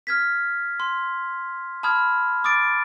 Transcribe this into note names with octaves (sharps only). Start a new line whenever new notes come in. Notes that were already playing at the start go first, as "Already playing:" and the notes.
F6 G#6 B6
C6
A5 B5 D#6 F6 G#6
D6 D#6 A6 D7